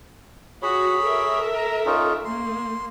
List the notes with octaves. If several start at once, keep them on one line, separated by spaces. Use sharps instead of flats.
F#4 G#4 C#5 B5
A4 A#4 E5
A#5
C#4 D#4 F4
A#3 C6